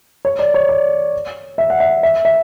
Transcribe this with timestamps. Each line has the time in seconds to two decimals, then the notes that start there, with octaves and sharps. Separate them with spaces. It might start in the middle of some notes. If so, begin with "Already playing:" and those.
0.25 C#5
0.39 D5
0.54 C#5
0.69 D5
1.58 E5
1.70 F#5
1.80 E5
2.03 E5
2.25 E5